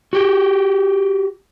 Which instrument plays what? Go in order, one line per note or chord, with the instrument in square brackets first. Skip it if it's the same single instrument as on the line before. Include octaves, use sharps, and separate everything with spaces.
[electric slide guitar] F#4 G4